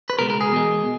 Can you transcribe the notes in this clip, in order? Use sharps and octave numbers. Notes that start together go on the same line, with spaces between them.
B4
C#2 B2 G#3 A#4
A#4
G#4
E2 B2 G#3